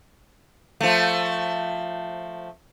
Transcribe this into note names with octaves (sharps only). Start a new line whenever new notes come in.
F3 A3